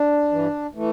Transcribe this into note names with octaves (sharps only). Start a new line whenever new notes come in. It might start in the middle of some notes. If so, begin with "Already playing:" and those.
Already playing: D4
G2 E3
E3 A3